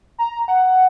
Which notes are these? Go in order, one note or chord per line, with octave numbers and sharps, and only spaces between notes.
A#5
F#5